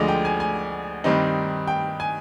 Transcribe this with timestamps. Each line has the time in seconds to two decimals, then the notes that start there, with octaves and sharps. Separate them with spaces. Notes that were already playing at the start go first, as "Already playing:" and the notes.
Already playing: D2 D3 F3 G#3 D5 D#5
0.08 G5
0.25 G#5
0.40 G#5
1.04 G2 D#3 G3 C4 D#4
1.67 G5
2.00 G#5